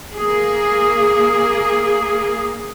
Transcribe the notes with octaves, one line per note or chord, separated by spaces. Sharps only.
A#3 G#4